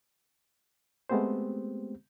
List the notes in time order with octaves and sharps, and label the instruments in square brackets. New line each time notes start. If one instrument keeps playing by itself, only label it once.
[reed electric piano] G#3 A3 B3 C4 G4 C5